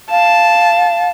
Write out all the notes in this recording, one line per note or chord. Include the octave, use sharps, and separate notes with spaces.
F5 A5